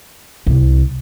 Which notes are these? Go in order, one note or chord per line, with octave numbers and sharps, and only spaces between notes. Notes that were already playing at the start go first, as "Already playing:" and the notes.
C2